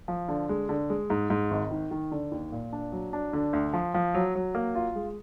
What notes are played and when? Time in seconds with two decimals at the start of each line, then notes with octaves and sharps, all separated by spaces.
0.08 F3
0.29 D3
0.49 G#3
0.69 D3
0.90 G#3
1.10 G#2
1.30 G#2
1.51 G#1
1.71 D#3
1.91 D#3
2.12 D3
2.32 D#2
2.52 A#2
2.73 D4
2.92 F#3
3.13 D4
3.33 D3
3.53 D2
3.73 F3
3.94 F3
4.14 F#3
4.35 F#3
4.55 A#3
4.75 F4
4.96 G#3